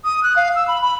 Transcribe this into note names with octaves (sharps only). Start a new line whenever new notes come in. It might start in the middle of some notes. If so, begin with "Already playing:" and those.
D#6
F#6
F5
E6
B5
B5